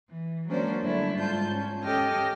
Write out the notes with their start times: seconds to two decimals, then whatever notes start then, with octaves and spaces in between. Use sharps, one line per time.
0.11 E3
0.48 F#3 G#3 A#3 C#4 D4 C5
0.84 D3 G3 A3 D4 E4
1.18 G#2 F4 A5 G6
1.48 C#4
1.84 C#4 G4 A4 D#5 G5 F6